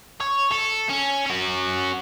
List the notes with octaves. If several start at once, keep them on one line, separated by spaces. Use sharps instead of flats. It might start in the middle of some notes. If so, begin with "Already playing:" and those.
C#5
A4
C#4
C#4 F#4